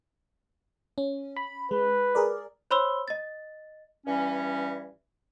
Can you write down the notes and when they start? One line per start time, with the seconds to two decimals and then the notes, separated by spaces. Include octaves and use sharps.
0.98 C#4
1.37 B5
1.71 G#3 B4
2.15 G#4 A#4 D5
2.71 C5 C#5 B5 C6 E6 G7
3.08 D#5 A6
4.07 G2 E3 G3 C#4